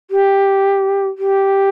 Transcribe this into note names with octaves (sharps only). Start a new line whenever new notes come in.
G4
G4